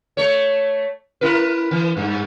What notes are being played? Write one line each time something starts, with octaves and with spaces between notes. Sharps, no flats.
A3 C#5
E4 A#4 B4
E3
G2